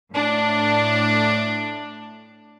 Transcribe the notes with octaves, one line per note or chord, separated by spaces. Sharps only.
A2 D4